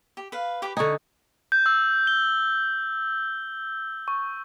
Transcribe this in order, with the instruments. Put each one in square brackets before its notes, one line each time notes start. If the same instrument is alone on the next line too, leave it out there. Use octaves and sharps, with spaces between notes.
[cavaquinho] G4
B4 F5
G4 B4 D6
[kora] D3 D#4 [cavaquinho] G#5 C#6
[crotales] G6
E6
G7
C#6